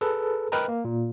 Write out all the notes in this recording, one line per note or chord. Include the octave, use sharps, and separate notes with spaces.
G#4 A4 B4
A#4 B4 D#5 G5 A#5
A#3
A#2